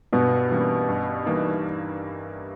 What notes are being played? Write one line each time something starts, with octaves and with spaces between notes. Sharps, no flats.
G2 B2 B3
E3 G3 A#3 C#4
G2
E3 G3 A#3 D#4